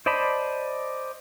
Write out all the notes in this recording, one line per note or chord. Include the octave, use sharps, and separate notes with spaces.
C5 D5 D#5 A5 B5